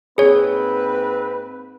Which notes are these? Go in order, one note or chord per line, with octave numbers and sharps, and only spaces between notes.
G#2 A#3 C4 G#4 B4 C#5